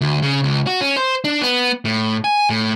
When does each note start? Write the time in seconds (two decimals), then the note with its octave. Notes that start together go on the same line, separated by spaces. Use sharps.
0.01 D2
0.22 C#3
0.43 C#2
0.67 F#4
0.81 C#4
0.97 C5
1.24 D4
1.42 B3
1.85 A2
2.24 G#5
2.50 A2